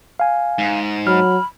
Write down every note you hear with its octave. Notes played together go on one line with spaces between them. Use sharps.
F5 G#5
G#2
F#3 B5 F6